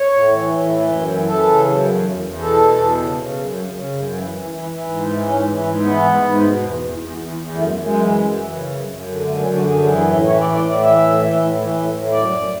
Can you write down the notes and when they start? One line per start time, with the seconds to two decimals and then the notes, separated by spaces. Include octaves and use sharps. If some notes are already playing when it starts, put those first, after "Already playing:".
Already playing: C#5
0.12 A2
0.31 E3
0.51 A2
0.69 E3
0.88 F#2
1.07 E3
1.26 E3 A4
1.46 C#3
1.65 F#2
1.83 E2
2.03 E2
2.22 E2
2.40 B2 A4
2.60 E2
2.78 B2
2.98 C#3
3.16 C#3
3.36 F#2
3.55 C#3
3.74 C#3
3.93 F#2
4.11 E3
4.31 E3
4.50 E3
4.70 E3
4.88 G#2
5.07 E3
5.26 G#2 C#4
5.46 E3
5.64 G#2
5.83 E3 B3
6.03 G#2
6.21 G#2
6.41 B2
6.60 E2
6.78 E2
6.98 E2
7.17 E2
7.36 E2
7.55 F#2 A3
7.74 F#2
7.84 G#3
7.94 E3
8.12 F#2
8.32 E3
8.51 C#3
8.69 F#2
8.88 F#2
9.07 D3
9.26 F#2 A3
9.41 C#4
9.46 D3
9.55 F#4
9.65 F#2 G#4
9.84 E3 G#4
9.98 G#4
10.02 A2
10.13 E4
10.22 E3 C#5
10.41 A2 D5
10.55 D5
10.59 A2
10.69 D5
10.79 E3 E5
10.98 A2
11.16 E3
11.36 A2
11.55 E3
11.74 A2
11.94 A2
12.12 F#2 D5
12.32 F#2